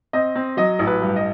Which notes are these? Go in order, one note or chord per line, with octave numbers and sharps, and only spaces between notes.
C4 D#5
C4
F#3 D#5
A1
B4
G2
D#5